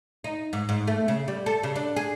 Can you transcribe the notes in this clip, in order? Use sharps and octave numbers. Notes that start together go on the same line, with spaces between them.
D#4
G#2
G#2
A3
C#3
G3
A4
C#3
D4
G#4